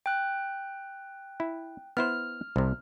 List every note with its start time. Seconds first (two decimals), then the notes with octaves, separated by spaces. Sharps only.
0.06 G5 F#6
1.40 E4
1.97 B3 E4 C5 F6
2.56 C2 C3